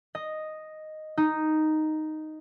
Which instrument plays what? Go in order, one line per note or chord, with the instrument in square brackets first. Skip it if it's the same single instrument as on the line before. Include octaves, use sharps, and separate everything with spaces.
[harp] D#5
D#4